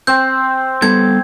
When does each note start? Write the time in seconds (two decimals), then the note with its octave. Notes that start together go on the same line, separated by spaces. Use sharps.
0.07 C4 G6
0.82 G3 B3 A4 G#6